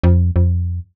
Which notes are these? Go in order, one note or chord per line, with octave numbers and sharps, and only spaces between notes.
F2
F2